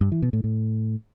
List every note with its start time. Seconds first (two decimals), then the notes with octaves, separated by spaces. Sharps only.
0.01 G2
0.12 E3
0.22 B2
0.33 A2
0.44 A2